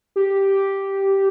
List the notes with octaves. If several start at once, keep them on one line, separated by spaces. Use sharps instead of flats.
G4